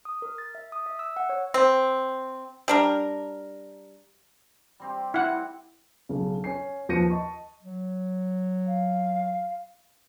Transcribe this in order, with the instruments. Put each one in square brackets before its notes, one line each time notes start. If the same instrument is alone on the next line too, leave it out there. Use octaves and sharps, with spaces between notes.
[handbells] D#6
A#4
A6
E5
D#6
E5
E6
F#5
C#5
[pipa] C4
G3 D4 A#4
[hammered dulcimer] G3 C4 G4
[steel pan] E4 F#5
[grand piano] B1 C#3
C#4 G#5 C7
D#2 F3 B4 A#6 C#7 D#7
D#5 A5 C#6
[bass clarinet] F#3
[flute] F5